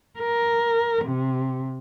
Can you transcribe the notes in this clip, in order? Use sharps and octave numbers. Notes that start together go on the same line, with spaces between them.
A#4
C3